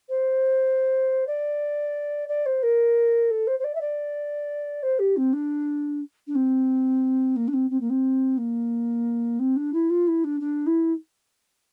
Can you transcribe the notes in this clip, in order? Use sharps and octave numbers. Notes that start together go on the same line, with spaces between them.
C5
D5
D5
C5
A#4
A4
C5
C5
D5
E5
D5
C5
G4
C4
D4
D4
C4
A#3
D4
C4
C4
A#3
C4
A#3
C4
D4
E4
F4
E4
D4
D4
E4